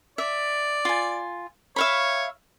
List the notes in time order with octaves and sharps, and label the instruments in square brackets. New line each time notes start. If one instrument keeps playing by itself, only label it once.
[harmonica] D5 [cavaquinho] E5
[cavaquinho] F4 G#5
[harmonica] C#5 [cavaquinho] E5 F5 B5